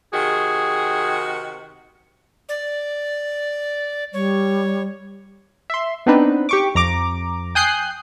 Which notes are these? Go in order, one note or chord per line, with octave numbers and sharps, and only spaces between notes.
C3 D#3 F#4 G#4
D5
G3 C#5
E5 C6
B3 C4 D4 D#4 B4
G4 C#6 D6
F2 A#5 D6
G5 G#5 D#6 F#6 G6 C7